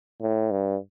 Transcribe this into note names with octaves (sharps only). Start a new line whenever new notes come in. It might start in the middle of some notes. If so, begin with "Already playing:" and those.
A2
G2